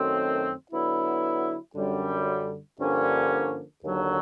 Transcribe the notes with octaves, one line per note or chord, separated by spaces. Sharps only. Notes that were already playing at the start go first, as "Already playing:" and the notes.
Already playing: F#2 D#3 F#3 A3 C4
D3 F#3 B3 E4
F#2 D3 G3
G2 D3 F3 A#3 C#4
D#2 D3 F#3